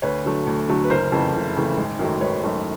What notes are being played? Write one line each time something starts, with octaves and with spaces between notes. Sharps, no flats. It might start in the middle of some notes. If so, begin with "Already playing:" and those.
D2 B4 C#5
D3 F#3 A3
D2
D3 F#3 A3
B4
F#1 A#4 C5
F2 C#3 E3 A3
F#1
F2 C#3 E3 A3
G#1
F#2 D#3 F#3 A3
G#1 B4 C#5
F#2 D#3 F#3 A3